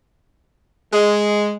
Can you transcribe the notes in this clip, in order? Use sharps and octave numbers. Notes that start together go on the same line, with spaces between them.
G#3